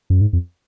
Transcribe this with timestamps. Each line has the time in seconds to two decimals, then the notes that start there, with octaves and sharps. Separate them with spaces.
0.10 F#2
0.21 G#2
0.33 F2